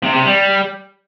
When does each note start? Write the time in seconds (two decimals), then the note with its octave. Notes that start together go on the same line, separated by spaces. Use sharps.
0.03 C3
0.14 C3
0.25 G3